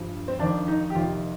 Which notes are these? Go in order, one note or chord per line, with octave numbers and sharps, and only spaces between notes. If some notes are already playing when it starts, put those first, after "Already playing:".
Already playing: G2 F3
C4
F2 D#3 D4
D#4
G4
F2 C3 D#3 F4